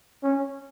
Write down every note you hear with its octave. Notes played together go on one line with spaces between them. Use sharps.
C#4